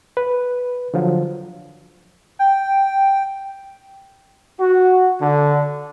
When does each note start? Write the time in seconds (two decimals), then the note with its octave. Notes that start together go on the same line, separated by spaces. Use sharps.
0.17 B4
0.94 D3 F3 F#3
2.39 G5
4.60 F#4
5.21 D3